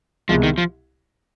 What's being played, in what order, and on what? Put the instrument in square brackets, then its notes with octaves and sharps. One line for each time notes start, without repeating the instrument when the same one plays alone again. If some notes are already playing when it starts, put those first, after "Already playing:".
[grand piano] C2 B2 G#3 [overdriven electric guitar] F3
[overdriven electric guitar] D#3
F3